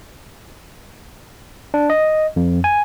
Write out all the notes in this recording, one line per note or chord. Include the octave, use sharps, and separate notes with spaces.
D4
D#5
F2
G#5